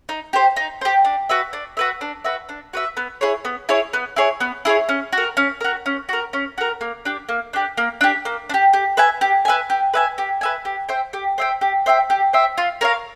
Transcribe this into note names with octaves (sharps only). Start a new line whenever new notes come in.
D#4
G4 C5
D#4
G4 C5
D4
F#4 B4 E5
D4
F#4 B4 E5
D4
F#4 B4 E5
D4
F#4 B4 E5
B3
E4 G#4 C#5
B3
E4 G#4 C#5
B3
E4 G#4 C#5
B3
E4 G#4 C#5
C#4
F#4
A#4
C#4
F#4 A#4
C#4
F#4 A#4
C#4
F#4 A#4
A#3
D4 G4
A#3
D4 G4
A#3
D4 G4
A#3
D4
G4
G4
B4 E5 G#5
G4
B4 E5 G#5
G4
B4 E5 G#5
G4
B4 E5 G#5
G4
C5 E5 G5
G4
C5 E5 G5
G4
C5 E5 G5
G4
C5 E5 G5
F4
A#4 C#5 F5